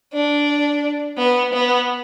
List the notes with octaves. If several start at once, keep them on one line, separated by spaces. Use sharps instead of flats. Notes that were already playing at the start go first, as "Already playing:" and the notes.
D4
B3
B3